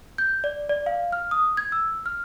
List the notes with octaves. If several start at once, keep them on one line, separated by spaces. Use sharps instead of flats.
G6
D5
D5
F5
F6
D#6
G#6
E6
F6